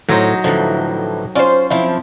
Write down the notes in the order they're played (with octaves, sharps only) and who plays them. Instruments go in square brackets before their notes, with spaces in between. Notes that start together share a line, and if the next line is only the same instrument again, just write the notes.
[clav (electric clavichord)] A2 C5 [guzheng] F#3 D#4
[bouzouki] A2 E3 [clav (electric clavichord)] D3 F3
[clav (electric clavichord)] C#4 F4 [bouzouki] C5 D5
[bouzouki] F3 C4 E4